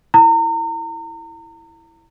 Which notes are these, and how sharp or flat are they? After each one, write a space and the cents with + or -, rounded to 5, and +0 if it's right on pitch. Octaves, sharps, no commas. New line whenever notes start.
E4 +0 A#5 -35